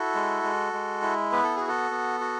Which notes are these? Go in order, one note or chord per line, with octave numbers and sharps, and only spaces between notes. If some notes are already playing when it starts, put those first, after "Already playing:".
Already playing: E4 F#4 A4
G#3
G#3
G#3
E4
B3 B4
A4
F#4 G#4
F#4 A4
B3
F#4